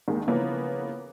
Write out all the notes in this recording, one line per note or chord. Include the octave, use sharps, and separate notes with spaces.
D#2 D#3 G#3
C#3 E3 F3 A#3 B3 C#4